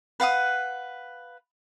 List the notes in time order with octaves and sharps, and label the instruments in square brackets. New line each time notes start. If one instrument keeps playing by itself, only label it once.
[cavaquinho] B4 F5 F#5 D#6